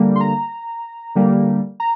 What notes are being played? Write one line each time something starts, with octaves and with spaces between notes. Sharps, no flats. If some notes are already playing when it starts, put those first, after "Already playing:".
Already playing: D3 G3 A#3
C6
A#5
D3 G3 A#3
A#5